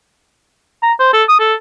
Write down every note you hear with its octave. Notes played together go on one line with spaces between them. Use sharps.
A#5
C5
A4
D#6
A4